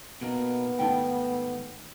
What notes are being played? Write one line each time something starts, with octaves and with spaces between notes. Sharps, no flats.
B2 A#3 B3 D#4
G#2 D#3 A3 D#4 G5